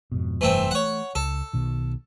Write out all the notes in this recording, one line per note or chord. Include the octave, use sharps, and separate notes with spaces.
F2 G#2 B2
F1 G2 E3 A3 C4
E3 A3 C#5 F#5
C#2 A4
B1 B2 D#3